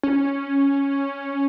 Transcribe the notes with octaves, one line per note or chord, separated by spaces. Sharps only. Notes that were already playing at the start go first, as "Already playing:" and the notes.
C#4